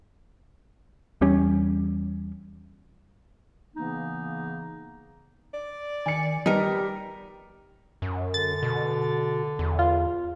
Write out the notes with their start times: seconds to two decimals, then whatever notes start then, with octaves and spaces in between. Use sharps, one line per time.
1.21 E2 G3 C#4
3.75 C#3 E3 A#3 B3 D#4
5.54 D5
6.06 D#3 G#5 C#7
6.46 G3 B3 D#4 G4 A#4
8.02 F#2
8.34 D3 A6
8.63 B2
9.59 E2
9.79 F4